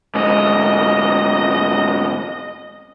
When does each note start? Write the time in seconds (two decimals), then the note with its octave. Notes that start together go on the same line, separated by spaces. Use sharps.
0.15 D2 G#2 D#5